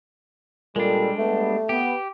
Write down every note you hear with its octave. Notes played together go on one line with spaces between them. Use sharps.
A#2 G3 G#3 D4 A4
G3 A3 B3
B3 G4